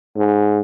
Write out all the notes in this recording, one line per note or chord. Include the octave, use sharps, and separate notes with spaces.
G#2